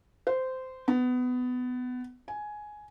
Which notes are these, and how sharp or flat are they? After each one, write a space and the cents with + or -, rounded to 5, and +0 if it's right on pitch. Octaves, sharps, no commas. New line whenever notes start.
C5 -15
B3 +20
G#5 +10